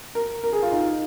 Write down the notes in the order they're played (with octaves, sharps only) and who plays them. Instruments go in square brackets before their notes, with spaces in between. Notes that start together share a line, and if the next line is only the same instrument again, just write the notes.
[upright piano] A#4
A#4
G#4
F4
D#4